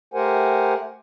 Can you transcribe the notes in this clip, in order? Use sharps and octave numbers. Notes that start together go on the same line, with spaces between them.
A3 G4 A#4 C5 F#5 G#5